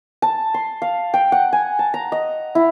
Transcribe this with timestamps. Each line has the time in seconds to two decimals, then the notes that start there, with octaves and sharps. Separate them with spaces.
0.22 A5
0.54 C6
0.82 F5
1.14 G5
1.32 F#5
1.53 G#5
1.79 A5
1.94 A#5
2.12 D#5
2.55 E4